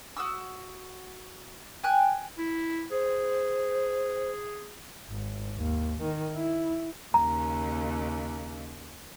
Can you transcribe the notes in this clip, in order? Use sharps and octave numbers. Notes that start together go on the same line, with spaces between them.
F#4 D#6 E6
G5 G#5 F#6
E4
G#4 C5
G#1
D#2
D#3
E4
D#2 C#3 A#5